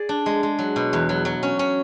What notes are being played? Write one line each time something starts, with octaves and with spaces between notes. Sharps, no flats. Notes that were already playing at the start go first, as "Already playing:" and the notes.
Already playing: G#4 D5
D4
G#3
G#3
F#3
B2
E2
F#3
F#3
C#4
C#4